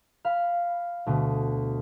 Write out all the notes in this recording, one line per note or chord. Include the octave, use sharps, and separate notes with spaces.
F5 B5
D2 B2